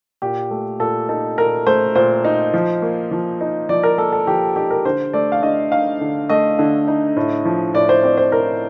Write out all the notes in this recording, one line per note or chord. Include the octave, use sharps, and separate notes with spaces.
A#2 G4
A3
A#2 A4
D#4 A4
A#2 A#4
A3 C5
A#2 C5
D#4
F3
A#3
F3
D#4
F3 D5
A#4
A#3 A4
A4
F3 G4
D#4 G4
A#4
D3 C5
A3 D5
F5
D3 D#5
D#4 F5
D3
A3 D#5
D3
D#4
A2
F3
A2 D5
C5
C4 D5
C5
A2 A#4